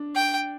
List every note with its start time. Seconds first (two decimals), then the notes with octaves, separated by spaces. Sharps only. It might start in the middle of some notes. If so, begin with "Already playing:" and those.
Already playing: D4
0.16 G5